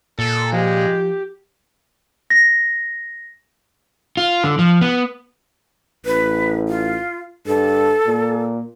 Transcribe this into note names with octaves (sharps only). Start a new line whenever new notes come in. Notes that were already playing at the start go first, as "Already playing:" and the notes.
A#2 A4
F3 G#3 F4 G4
A#6
F4
D3
F3
B3
A1 B4
F4
G2 A4
A#2